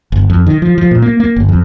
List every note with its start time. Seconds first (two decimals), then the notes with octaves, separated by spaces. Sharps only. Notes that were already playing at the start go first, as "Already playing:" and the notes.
0.12 G1
0.30 F2
0.47 D#3
0.62 F3
0.78 F3
0.91 A#2
1.02 A#3
1.20 A#3
1.36 G1
1.49 F2